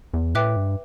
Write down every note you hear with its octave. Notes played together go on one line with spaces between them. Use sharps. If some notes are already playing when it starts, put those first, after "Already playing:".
E2
A2 B4 E5 G5 D6 F#6
G2